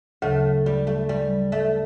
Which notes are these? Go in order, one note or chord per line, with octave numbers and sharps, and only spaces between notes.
D2 C#3 F#3 A3
G3
A3
G3
A3